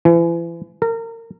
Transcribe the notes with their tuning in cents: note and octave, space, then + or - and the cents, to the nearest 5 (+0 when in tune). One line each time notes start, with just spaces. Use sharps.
E3 +35
A#4 -30